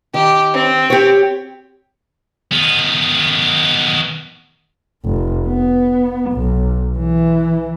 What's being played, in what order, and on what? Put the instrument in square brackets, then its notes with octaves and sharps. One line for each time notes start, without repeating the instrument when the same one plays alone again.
[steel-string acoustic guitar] D#3 [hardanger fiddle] G4
[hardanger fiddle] C4
[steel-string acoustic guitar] G4 C#5
[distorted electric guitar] D#3 B3
[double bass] F1
B3
B1
E3